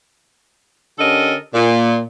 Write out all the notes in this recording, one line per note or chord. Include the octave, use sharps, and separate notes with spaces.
D3 C#4 G4 A4 A#4 D#5
A#2